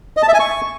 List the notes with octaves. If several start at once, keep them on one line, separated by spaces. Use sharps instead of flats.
D#5
A5
E5
G#5
C#6